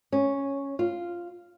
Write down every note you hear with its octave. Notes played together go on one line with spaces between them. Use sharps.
C#4
F4